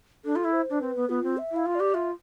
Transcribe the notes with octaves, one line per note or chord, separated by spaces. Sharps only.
D4 A4
F4
E4
C5
D4
C4 B4
B3
B3 F4
C4
E5
E4
F5
F4
G4 D5
F4 E5